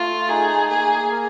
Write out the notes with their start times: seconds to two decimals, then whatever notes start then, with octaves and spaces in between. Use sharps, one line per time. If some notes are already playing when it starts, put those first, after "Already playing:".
Already playing: A3 F4
0.29 D#4 G#4
0.70 A#3 G#4
1.11 A#4